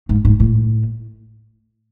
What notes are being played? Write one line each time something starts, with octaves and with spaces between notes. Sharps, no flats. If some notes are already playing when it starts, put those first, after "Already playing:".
G#2
G#2
A2